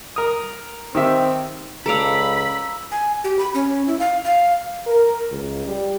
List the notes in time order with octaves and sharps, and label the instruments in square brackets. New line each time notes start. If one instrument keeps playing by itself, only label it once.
[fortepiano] A#4 D#6
[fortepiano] D#3 G4 E5 [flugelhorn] C4
[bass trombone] C#2 [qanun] A4 D5 F5 [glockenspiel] A#5 E6 [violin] B5
[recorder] G#5
G4
B5
C#4
E4
F5
F5
[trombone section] A#4
C#2
G3